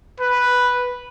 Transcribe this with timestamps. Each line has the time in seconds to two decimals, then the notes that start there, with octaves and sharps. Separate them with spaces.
0.20 B4